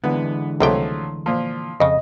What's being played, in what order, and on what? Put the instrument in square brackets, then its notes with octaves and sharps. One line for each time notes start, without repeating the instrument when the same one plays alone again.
[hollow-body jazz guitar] D3 E3 G#3 [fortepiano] B3
[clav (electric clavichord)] C#2 C3 G5 [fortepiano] F3 F#3 A3
[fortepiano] A#2 F3
[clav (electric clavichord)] F2 C#3 [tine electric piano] D#5